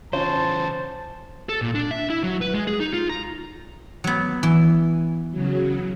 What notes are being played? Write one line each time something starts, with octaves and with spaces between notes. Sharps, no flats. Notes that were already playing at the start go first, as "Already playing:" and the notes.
C#3 E3 C#4 F4 C5 C#5 A5
A4
A#2
D4
E5
E4
F#3
B4
G#3
G#4
D#4
F4
A#5
F#3 B3
E3
C#3 F#3